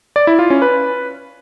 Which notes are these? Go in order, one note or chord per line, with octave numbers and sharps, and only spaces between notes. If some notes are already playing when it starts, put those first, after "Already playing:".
D5
E4
F4
C#4
B4